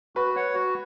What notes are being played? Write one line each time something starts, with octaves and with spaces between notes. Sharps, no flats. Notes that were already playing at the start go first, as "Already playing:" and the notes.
F#4 B4
C#5 F#5
F#4